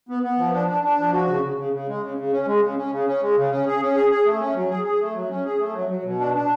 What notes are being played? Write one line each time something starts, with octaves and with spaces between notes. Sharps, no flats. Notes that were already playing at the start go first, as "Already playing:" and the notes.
B3
B3
F3
D4
D4
D4
F3
F#4
C#3
C#3
C#3
C#3
G#3
C#3
C#3
C#4
G#3
C#3
C#4
C#3
C#4
G#3
C#3
C#4
G#4
C#4
G#4
G#4
A3
C#4
F#3
G#4
G#4
A3
F#3
C#4
G#4
A3
F#3
F#3
B2
D4
D4